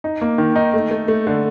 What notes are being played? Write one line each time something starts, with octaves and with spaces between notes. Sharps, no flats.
D#4
A#3
D#3
D#4
A3
A3
A3
D3